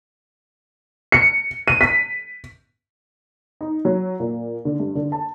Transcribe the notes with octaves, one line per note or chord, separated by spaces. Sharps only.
C#7
D#7
B6
D#4
F#3
A#2
D3
G2
D3
A5